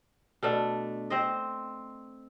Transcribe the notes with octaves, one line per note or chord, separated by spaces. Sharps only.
B2 A3 D4
C4 C5 D#5